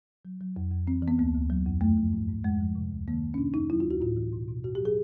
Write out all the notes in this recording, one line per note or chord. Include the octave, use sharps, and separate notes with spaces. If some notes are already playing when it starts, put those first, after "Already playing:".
F#3
F#3
F2
F2
E3 C4
E3
B3
D2 A#3
D2
F#3
F2
F#2 A3
F3
G#2
G#2
F2 G#3
F3
C3
D2
D#3 A#3
F#2
C#4
C3 D4
F2 D#4
F#3 E4
F4
D2
F#4
A2 F4
E3
B2
B2
G2 F#4
F#3 G4
G#4